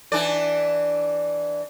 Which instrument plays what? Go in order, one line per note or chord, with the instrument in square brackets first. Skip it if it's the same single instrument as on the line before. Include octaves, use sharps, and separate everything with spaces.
[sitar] E3 D4 D5